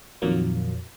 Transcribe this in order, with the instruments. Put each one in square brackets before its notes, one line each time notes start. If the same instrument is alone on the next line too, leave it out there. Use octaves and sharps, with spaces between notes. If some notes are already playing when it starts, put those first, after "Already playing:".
[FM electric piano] F2 A#2 D#3 F#3 A#3